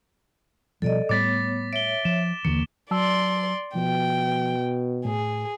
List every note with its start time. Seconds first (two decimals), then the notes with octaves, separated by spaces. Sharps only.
0.82 B2 F3 G3 A4 D5 D#5
1.09 A2 G3 A3 B3 C#5 D6 A6 B6
1.73 C#5 E5 D7 G7
2.05 F3 E7
2.45 D#2 D3 E3 A#3
2.91 F#3 D5 A5 C6 E6
3.75 B2 F3 G5
5.05 A2 G#4